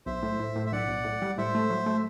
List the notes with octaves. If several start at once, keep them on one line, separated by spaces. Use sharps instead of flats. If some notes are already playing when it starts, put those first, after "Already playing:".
B1 C5 E5
A2
A2
A2
E5
B1 D5 F#5
B1
A2
G3
A2 C5 E5
A3
F#3
A3